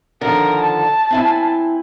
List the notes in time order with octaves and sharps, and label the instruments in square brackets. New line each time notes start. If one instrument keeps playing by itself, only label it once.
[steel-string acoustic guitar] D3 D#3 F3 [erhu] A#4
[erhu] A5
[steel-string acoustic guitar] C4 E4 G#5